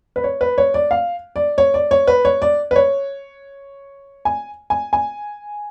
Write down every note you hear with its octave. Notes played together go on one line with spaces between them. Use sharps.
B4
C#5
B4
C#5
D5
F5
D5
C#5
D5
C#5
B4
C#5
D5
B4
C#5
G#5
G#5
G#5